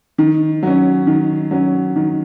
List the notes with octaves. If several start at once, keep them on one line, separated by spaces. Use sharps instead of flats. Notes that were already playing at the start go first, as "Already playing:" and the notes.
D#3
F#3 C#4
D#3
F#3 C#4
D#3